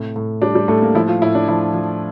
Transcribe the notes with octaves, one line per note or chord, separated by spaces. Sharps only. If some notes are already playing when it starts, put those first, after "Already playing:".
Already playing: A2 C3
A2
G3 D4
G3
A2 A3
A#3
F3 E4
F4
A2 E4
D4
F3 E4
F3